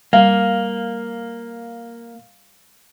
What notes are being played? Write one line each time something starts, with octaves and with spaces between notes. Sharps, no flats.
G3 A#3 F5